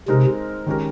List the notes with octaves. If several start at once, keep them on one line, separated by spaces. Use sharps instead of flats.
C3 G#3 C4 D#4 A#4
D#3 G#3 C#4 G4 A#4